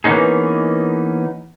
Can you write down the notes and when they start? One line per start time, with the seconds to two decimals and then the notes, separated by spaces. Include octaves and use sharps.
0.04 E3 A#3 B3 C#4 D#4 G#4